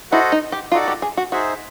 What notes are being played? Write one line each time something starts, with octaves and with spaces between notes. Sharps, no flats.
E4 F#4 A4 C5 D#5 F#5
D#4
G4
D#4 F4 F#4 A4 D5 F#5
G4
G#4
F#4
D#4 F#4 G#4 C5 E5